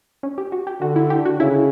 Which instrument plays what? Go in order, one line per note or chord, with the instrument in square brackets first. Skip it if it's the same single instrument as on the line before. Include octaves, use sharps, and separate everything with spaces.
[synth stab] C#4
G4
F#4
G4
[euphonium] D3 [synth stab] F#4
[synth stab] E4
G4
F#4
[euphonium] C#3 [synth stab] E4